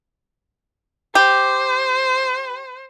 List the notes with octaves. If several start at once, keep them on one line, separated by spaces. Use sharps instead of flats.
G4 C5